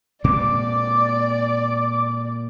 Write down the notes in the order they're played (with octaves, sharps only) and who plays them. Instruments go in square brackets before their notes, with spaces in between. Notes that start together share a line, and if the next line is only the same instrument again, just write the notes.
[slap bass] A#2 G#3 C4 [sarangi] D5 [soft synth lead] D6